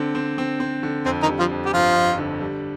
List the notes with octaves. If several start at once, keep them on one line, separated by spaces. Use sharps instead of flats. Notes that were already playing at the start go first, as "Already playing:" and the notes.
Already playing: D3 C4
C4
C4
C4
D3
F2 C4
D#3 D#4
G3
F3 F4
F2
G4
G1 F3 F4
F2
D3
G3